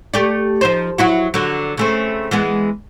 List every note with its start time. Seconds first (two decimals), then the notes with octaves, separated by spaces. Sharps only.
0.14 A3 G4 D5
0.61 F3 D#4 C5
0.98 F#3 E4 F#4
1.34 D3 F#3
1.77 C#3 A3 C4
2.31 E3 G#3 B3